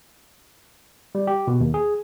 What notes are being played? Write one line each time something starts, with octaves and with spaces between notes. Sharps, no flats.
G3
G4
B2
D#2
G#4